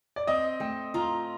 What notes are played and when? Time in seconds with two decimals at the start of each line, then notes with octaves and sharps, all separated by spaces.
0.16 D5
0.27 C4 D#5
0.60 A3 G5
0.94 F4 A#5